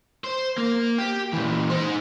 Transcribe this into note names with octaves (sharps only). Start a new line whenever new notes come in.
C5
A#3
G4
A#2 E3
D#4 C5